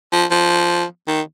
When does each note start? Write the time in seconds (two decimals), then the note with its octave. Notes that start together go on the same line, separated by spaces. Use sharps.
0.12 F3
0.31 F3
1.08 D#3